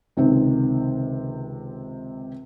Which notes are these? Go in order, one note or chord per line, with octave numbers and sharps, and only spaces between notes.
C#2 C3 D#3 C4